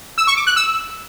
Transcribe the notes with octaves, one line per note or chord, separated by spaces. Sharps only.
E6
C#6
D6
F#6
E6